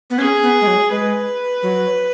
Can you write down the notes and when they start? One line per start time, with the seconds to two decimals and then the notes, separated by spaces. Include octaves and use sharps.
0.10 B3
0.18 C#4 G#4
0.43 B3
0.61 G#3
0.67 F#3
0.90 G#3 B4
1.63 F#3